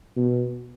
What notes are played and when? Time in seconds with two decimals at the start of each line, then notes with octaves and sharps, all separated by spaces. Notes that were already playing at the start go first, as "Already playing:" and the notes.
0.16 B2